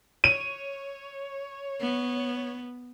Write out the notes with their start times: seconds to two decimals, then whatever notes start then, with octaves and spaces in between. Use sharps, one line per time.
0.24 C#5 D#7
1.81 B3